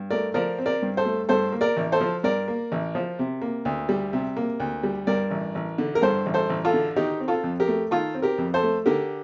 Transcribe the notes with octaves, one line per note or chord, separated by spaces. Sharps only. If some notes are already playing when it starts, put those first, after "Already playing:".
Already playing: G2
A3 A#4 D5
F3 A#4 D5
C4
A#4 D5
G2
A4 C5
A3
G2 A4 C5
A#3
A#4 D5
A1
A4 C5
F3
G2 A#4 D5
A#3
A1
F3
C3
A#3
D2
G3
C3
A#3
D2
G3
G2 A#4 D5
A1
A1
D3
A#4
G2 A4 C5
A1
A4 C5
A1
F4 A4
D3
D#3 D#4 G4
C4
F4 A4
F2
G4 A#4
A3
D#3 F4 A4
C4
G4 A#4
F2
A4 C5
A3
D3 G4 A#4